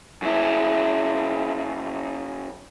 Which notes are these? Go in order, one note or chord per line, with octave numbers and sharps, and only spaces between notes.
F#2 E4